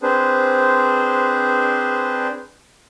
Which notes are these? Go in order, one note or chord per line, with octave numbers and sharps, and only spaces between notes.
C4 D4 G#4 B4 C5